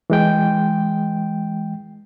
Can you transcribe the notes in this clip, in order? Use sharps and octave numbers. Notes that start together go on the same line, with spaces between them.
E3 G#3 G5